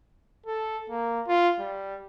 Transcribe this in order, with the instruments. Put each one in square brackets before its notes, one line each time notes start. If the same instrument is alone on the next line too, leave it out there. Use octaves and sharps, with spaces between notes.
[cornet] A4
A#3
F4
G3